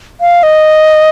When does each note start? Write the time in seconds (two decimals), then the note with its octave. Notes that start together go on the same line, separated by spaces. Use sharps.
0.21 F5
0.43 D#5